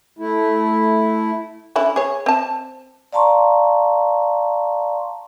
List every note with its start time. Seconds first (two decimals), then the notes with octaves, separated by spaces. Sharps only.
0.19 A3 E4
1.76 D3 C#4 E4
1.96 G#4 C#5
2.26 C4 A5
3.13 D5 F5 A5 A#5 C6 C#6